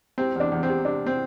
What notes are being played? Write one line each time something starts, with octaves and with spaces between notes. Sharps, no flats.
C3 C4
E2 D4
E2
C4
C3
C3 D4
C4